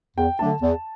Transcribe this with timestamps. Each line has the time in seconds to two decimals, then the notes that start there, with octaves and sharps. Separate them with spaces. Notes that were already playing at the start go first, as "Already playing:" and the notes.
0.17 E2 G5
0.39 D3 F#3 A3 D4 A5
0.62 E2